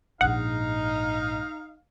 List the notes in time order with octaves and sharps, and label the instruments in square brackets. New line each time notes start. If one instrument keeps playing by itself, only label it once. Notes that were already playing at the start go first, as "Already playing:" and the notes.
[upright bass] A#1 G#2 [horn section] D#4 [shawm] F5 [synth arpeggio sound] F#5